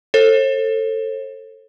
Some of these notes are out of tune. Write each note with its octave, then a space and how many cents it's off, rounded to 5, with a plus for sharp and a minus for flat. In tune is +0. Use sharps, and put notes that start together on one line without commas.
A4 +20 C5 +45